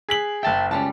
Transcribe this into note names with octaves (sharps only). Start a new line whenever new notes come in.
G#4 B6 F#7
F#1 E5 G5 A5
C#2 G3 C#4 A5